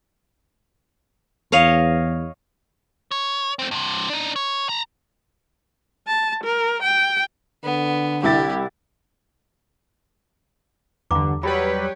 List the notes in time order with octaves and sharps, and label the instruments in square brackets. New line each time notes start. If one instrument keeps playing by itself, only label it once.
[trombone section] E2 [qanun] C#5 D#5 F5
[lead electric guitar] C#5
A3 C4
G2 C3
D4 D#4
C#5
A5 A#5
[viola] A5
A#4
G5
[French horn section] D3 [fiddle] B3
[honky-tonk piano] C2 E4 A6 [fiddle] G4
[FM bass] E2 [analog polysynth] G2 D3 [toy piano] F#5 A#5 D6
[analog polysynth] F#3 G3 B4 [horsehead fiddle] G4 C#5 [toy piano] B5